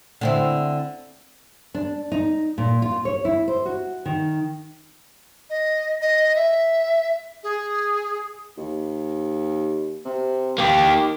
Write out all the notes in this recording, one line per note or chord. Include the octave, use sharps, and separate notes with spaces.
D3 C4 E4
D4
D#4
A#2
F4
C#5
E4
C5
F#4
D#3
D#5
D#5
E5
G#4
D#2
C3
A#3 G4
D#3